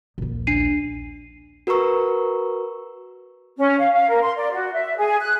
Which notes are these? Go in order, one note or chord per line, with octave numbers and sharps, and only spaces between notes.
A#1 D#2
D4 C7 D#7
F#4 A#4 B4 A#5 C#6 E6
C#4
F5
F5
A#4
C6
D5
F#4
E5
G#4
F#6